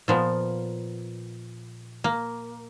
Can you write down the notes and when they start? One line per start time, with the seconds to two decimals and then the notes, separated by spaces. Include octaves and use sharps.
0.08 A#2 F3 B3
2.04 A#3